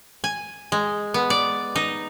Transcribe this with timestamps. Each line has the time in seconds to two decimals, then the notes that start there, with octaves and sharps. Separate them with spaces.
0.24 G#5
0.72 G#3
1.14 B3
1.30 D5
1.76 D#4